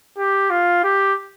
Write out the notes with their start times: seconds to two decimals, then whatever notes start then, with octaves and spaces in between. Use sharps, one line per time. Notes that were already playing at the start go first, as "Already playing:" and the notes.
0.18 G4
0.50 F4
0.84 G4